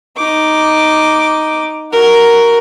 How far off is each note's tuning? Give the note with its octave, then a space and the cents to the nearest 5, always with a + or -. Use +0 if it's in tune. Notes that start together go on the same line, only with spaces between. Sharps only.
D#4 +0 D6 +0
F#4 +10 A#4 +0